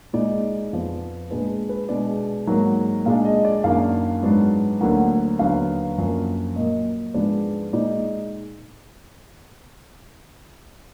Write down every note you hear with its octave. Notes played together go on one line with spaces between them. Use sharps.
A#2 G#3 D#4 D5
F2 F3 B3
A#2 G#3 D4 B4
B4
B2 G#3 B3 D4 D5
G#2 D#3 F#3 A#3
A#2 G#3 D4 F5
D#5
D5
F#2 D#3 A#3 D4 F5
G#2 F#3 B3 D4
D2 D3 F#3 A#3 F#5
D#2 D3 F#3 B3 F5
F#2 F3 A#3 D4
A#2 F#3 A#3 D#5
G#2 F3 G#3 B3 D4 D5
A#2 G#3 D#4 D5